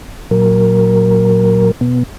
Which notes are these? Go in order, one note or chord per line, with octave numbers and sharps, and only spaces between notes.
A#2 F#3 A#4
B2 B3